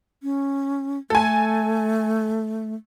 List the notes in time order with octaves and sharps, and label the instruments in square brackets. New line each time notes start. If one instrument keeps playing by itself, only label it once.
[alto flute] C#4
[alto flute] A3 [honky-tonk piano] A4 G#5